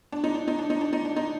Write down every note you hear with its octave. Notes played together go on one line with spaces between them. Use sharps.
D4
D#4
D4
D#4
D4
D#4
D4
D#4
D4
D#4